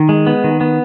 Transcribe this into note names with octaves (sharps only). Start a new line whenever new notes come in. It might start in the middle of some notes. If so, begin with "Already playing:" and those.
Already playing: D#3
G#3
B3
D#3
B3